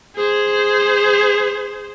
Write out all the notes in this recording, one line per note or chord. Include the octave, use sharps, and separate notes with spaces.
G#4 C5